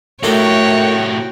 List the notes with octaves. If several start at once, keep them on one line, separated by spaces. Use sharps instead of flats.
A2 C3 A3 A#3 D#4 F#4 C#5 G5